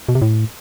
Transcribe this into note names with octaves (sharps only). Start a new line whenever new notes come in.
B2
C3
A2